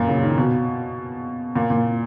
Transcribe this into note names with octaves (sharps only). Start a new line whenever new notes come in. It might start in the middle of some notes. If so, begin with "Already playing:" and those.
Already playing: F#2 A#2
C#3
D#3
B2
A#2
A#2